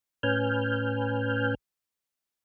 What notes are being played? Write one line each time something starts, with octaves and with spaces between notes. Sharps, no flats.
A2 C#4 B4 G#5 F6 G6